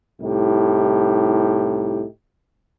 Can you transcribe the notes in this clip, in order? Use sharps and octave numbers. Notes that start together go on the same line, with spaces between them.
C2 A2 D#4 G4